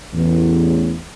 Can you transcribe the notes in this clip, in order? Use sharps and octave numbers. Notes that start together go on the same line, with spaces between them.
A1 E2